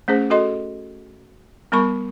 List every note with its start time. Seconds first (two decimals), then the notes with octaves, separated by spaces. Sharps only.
0.08 A3 C#4 G#4 C5
0.30 F#4 A4 D#5 C6
1.72 G3 B3 A#4 B5 C#6